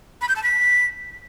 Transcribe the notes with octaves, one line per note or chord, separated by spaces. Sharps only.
B5
G6
A5
B6